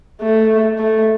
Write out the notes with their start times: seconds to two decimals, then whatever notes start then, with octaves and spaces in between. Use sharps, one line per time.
0.22 A3
0.78 A3